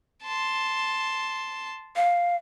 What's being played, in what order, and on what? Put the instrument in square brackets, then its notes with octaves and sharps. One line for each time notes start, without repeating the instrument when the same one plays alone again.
[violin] A5 C6
[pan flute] F5